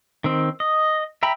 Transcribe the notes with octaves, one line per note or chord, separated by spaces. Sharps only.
D#3 C4
D#5
E5 G5 A#5 B5